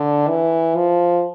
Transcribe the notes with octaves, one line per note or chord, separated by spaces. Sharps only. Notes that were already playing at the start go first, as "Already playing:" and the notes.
Already playing: D3
E3
F3